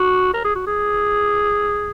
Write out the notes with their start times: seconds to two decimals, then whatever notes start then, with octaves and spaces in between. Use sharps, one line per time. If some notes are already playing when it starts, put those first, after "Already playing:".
Already playing: F#4
0.34 A#4
0.44 G#4
0.55 F#4
0.67 G#4